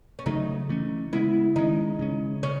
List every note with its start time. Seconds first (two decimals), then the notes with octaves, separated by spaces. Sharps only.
0.19 C#4
0.26 C#3 F#3 A3 D#4
0.69 E3 A3 C#4
1.13 C#3 G#3 B3 E4
1.56 D#3 G#3 C#4 D#4
1.99 C#3 G#3 C#4
2.43 C#3 C#4